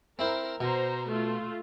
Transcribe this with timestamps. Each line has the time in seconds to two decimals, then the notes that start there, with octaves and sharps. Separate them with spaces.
0.19 C4 E4 A#4 C5
0.61 B2 C5 A#5
1.08 A3 F4